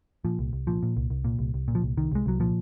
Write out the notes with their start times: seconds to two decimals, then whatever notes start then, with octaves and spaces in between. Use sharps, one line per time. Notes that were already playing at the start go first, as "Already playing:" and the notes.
0.25 A#2 F3
0.39 C2
0.53 C2
0.67 A#2 F3
0.83 A#2
0.97 C2
1.10 C2
1.24 A#2
1.39 C2
1.54 C2
1.68 A#2
1.75 F3
1.83 C2
1.97 C2 D#3
2.12 C2 G#3
2.26 C2 F#3
2.40 A#2 F3